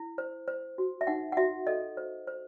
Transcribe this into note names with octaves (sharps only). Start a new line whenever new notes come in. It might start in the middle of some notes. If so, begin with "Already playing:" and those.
Already playing: E4
C5
C5
F#4
E5
D#4 F#5
F#5
F#4 E5
A4 D#5
C5
C5